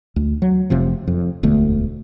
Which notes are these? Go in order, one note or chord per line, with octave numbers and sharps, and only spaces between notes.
D2
F#3
F1 C3 F3
F2
E1 D2 D3 A3